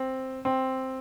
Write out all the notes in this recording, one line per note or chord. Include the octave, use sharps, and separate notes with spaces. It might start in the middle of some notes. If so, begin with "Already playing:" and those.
Already playing: C4
C4